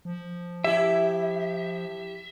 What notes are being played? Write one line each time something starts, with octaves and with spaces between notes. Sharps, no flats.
F3
E4 G4 E5